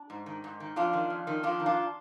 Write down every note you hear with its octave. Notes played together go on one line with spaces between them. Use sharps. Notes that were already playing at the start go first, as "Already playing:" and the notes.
Already playing: D4
G#2
D#3
G#2
D#3
F2 D4 F4
D#3
F2
D#3
F2 D4 F4
D#3
D4 F4